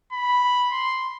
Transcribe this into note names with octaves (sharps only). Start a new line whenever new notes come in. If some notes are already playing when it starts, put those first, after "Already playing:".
B5
C6